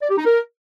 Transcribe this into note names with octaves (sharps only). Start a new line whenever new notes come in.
D5
G4
D#4
A#4